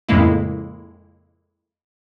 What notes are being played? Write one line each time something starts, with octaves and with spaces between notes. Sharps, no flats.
F2 A2 C#3 G#3 A#3 E4